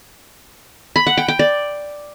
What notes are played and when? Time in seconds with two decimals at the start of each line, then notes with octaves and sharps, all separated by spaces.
0.96 B5
1.07 F#5
1.17 G5
1.28 G5
1.39 D5